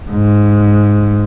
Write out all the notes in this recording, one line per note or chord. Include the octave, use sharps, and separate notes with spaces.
G#2